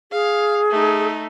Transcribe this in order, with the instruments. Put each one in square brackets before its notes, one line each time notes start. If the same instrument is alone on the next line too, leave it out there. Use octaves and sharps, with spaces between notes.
[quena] G#4 [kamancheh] F5
[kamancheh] A3 D#4